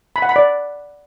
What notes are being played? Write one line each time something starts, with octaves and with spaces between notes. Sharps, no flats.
B5
F#5
B5
D5